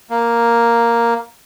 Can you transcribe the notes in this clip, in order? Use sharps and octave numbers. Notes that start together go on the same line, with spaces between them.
A#3